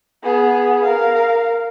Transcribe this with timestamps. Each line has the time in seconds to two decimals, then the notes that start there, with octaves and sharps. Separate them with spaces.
0.24 B3 G#4
0.84 A#4 F5